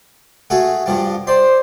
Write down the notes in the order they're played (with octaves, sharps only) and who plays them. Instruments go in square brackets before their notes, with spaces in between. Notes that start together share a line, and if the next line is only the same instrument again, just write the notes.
[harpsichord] A3 F#4 G#4
G2 F3 G3
[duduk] C5 [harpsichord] D5 C6